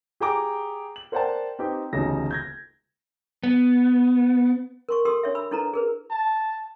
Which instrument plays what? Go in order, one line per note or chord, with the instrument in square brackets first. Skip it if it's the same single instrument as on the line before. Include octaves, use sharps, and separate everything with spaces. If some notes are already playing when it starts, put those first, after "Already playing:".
[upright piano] G4 G#4 G5 A#5 D6
F#7
A#4 C5 D5 F#5 G5 A5
C4 D#4 G4 B4 G5
E1 D2 C#3 D#4 G4 A#6
G6 G#6 A#6
[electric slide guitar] B3
[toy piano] A#4 C6 C#6
G4 A4 A#4 C6 D#6 E6
D4 C#5 E5
B5 E6
D4 E4 A4 B4 A#5
G#4 A#4 B4
[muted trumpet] A5